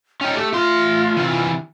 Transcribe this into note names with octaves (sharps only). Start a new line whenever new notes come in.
C#4 D#4 G5
A3 G4
A3 F4 C6
C3 E3